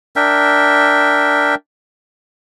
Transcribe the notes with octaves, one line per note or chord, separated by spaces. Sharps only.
D4 A#4 E5 G5